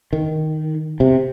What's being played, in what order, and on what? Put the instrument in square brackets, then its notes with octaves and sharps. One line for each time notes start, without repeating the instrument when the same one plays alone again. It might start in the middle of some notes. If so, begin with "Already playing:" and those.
[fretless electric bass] D#3
C3